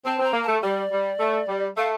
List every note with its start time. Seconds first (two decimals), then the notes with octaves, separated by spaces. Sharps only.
0.05 C4 A5
0.19 C4 A#5
0.34 A#3
0.43 A3 A5
0.62 G3 D5
0.91 G3
1.20 A3
1.49 G3
1.77 A3 F5